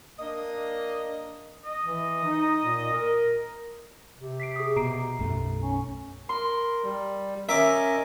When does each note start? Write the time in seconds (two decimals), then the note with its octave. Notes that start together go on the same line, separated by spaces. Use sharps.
0.19 A#3 D4 D#5
1.65 D#5
1.84 E3
2.25 D#4
2.64 A#2
2.93 A#4
4.18 C3
4.40 B6 C7 D7
4.56 G#4 D#6
4.76 B2 A#5 C7 D7
5.19 B1 F#2 A3
5.61 C#4
6.29 A#4 C6
6.83 G3
7.49 C#4 A#4 D#5 E5 D6